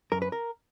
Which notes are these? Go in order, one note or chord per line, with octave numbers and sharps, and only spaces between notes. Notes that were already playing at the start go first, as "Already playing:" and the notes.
F#2 A#4
B4
A#4